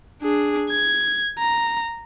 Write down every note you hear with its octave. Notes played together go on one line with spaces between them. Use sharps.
D4 G#4
G#6
A#5